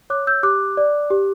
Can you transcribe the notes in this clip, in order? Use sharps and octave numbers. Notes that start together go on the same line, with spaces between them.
C#5 D6 F#6
E6 G6
G4 D6 F#6
D5
G4